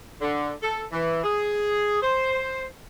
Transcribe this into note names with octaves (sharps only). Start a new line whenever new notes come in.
D3
A4
E3
G#4
C5